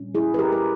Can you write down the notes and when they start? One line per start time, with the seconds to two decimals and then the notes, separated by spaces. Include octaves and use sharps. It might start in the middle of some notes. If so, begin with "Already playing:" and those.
Already playing: A#2 G3 C#4
0.15 E4 G#4
0.34 B4
0.39 G4 A#4
0.52 A#4